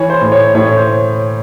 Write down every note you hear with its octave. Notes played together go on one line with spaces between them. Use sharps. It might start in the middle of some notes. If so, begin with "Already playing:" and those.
Already playing: E3 C#5
C5
A2
C#5
A2 C#5
C5